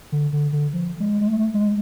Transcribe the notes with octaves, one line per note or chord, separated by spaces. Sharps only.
D3
D3
D3
F3
G#3
G#3
A3
G#3